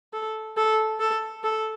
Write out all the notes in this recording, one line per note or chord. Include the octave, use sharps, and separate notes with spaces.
A4
A4
A4
A4